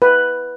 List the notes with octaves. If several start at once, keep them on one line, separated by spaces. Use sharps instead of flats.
B4